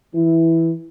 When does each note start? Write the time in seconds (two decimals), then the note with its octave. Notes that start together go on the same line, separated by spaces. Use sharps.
0.15 E3 E4